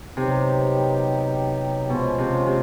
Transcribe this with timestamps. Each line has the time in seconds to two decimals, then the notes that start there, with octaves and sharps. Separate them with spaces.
0.17 C3 F#3 B3 D#4 G4
1.89 B2 F3 G#3 C#4 F4
2.18 C3
2.46 C3